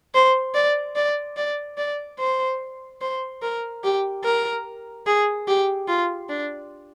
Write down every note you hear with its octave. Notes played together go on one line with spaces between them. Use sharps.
C5
D5
D5
D5
D5
C5
C5
A#4
G4
A#4
G#4
G4
F4
D4